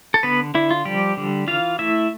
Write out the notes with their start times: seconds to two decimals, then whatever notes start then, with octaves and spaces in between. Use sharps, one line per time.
0.14 A4
0.23 D3 B3 B4
0.55 D3 E4
0.71 F4
0.85 F3 G3 G4
1.17 D3
1.47 E3 F4 F5
1.79 A3 E4 E5